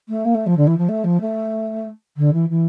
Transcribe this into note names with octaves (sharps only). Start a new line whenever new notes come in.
A3
A#3
A3
F3
D3
E3
F3
A3
F3
A3
D3
E3
E3